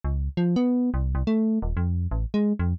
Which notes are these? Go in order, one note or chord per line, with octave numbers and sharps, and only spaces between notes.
C#2
F3
B3
C2
C2
A3
D#1
F2
A1
G#3
F2